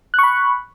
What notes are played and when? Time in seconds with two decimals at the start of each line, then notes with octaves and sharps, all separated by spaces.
0.14 F#6
0.19 C#6
0.23 B5